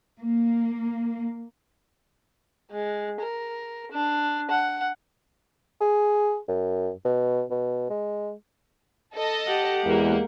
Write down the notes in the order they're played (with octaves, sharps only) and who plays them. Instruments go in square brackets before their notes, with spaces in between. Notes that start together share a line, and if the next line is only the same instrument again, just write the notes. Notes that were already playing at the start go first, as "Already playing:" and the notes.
[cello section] A#3
[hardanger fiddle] G#3
A#4
D4
F#5
[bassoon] G#4
F#2
B2
B2
G#3
[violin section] A4 D#5
[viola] G4 F#5
[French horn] E2 [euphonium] G#3 [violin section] A#3